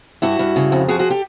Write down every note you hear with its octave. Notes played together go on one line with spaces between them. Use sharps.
G2 E4 F#4
G2
C#3
F2
F3 F#4 G#4
F#4 G#4
G4 A4